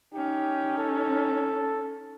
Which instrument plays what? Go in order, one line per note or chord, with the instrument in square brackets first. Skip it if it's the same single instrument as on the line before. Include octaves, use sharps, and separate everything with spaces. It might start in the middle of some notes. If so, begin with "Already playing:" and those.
[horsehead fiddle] C#4 D#4 [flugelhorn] G4
[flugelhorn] A4